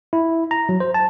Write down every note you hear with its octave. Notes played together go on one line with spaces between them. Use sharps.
E4
A#5
F#3
C5
A5